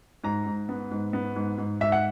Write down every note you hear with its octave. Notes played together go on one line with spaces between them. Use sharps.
G#2 A#5
G#2
B3
G#2
B3
G#2
G#2
G#2 E5
F#5